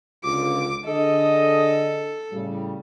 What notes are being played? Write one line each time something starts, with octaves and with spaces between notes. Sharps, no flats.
C#2 D3 F4 D6
D3 G#4 A4 D#5
A2 C#3 G3